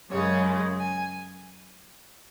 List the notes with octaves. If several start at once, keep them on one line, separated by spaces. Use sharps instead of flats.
F#2 C#3 G#3 C#5
G#5